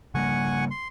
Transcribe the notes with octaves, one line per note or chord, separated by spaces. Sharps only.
C#3 G3 A#3 F#5 G#5 C#6
C6